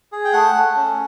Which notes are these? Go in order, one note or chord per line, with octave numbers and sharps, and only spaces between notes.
G#4
G5
A3 F#5
A3
C#4